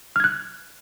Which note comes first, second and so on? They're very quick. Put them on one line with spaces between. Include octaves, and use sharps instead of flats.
F6 G#6 F#6